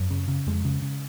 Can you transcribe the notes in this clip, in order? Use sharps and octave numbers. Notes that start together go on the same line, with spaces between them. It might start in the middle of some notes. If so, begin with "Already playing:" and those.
Already playing: F#2
C#3
C#3
F2 G#3
C#3
C#3